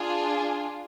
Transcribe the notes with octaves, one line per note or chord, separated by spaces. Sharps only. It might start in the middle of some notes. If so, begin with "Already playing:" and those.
Already playing: D4 F4 G#4